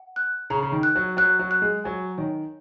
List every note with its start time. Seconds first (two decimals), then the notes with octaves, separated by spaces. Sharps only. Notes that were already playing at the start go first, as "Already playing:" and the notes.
Already playing: F#5
0.16 F#6
0.50 C#3 A#5
0.62 C#3
0.72 D#3
0.83 F#6
0.95 F#3
1.17 F#3 F#6
1.39 F#3
1.51 F#6
1.62 G#3
1.84 F#3 G#5
2.18 D#3 C#5